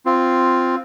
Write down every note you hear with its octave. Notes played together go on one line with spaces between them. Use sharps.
C4 F4